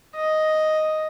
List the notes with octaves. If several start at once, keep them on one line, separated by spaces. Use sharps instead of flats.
D#5